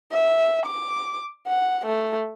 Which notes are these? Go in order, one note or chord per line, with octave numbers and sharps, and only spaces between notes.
E5
D6
F#5
A3